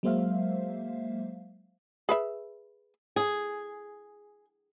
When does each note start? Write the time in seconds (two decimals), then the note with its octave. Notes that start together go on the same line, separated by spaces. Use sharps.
0.03 F#3 G#3 A#3 C5 E5 F5
2.09 G#4 B4 E5
3.16 G#4